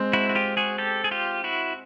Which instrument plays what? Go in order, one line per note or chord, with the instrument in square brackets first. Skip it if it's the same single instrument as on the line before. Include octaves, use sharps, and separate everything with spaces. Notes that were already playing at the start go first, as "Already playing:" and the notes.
Already playing: [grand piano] G#3 C4
[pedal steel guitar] E4 F#4
F#4
F4 G4
F#4 G#4
G4 A4
G#4
F4 G4
E4 F#4